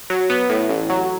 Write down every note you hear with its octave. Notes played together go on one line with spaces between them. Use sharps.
F#3
B3
A2
A1
F#3